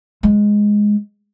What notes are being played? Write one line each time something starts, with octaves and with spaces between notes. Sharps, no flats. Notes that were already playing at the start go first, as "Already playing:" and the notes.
G#3